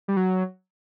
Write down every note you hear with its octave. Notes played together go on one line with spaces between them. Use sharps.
G3
F#3